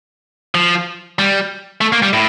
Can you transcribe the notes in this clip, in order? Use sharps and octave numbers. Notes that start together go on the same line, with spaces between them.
F3
G3
A3
A#3
G3
A2